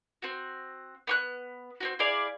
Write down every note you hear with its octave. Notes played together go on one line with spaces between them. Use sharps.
C4 F#4
B3 C#6 F#6
C4 C#4 F#4
E4 G#4 D5 F5